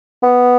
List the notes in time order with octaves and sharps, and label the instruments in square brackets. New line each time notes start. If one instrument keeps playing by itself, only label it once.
[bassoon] B3